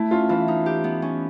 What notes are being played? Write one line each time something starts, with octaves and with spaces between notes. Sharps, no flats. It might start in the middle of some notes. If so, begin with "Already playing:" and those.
Already playing: A3 E4
C#4 F4
E3 F4
D#4
G4
B3
C#4